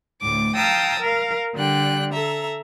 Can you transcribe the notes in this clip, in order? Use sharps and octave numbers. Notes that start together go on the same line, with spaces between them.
D2 A2 D6
F5 G5 A5 A#5 D#6 E6
A#4 F5
D3 G3 G5 F#6
A4 E5 A#5